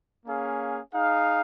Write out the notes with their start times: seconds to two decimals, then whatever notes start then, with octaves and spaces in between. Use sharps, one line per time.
0.25 A#3 C#4 G#4 F5
0.93 D#4 G#4 F5